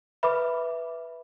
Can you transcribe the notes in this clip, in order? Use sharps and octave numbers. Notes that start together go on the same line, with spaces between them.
B4 E5 B5 D6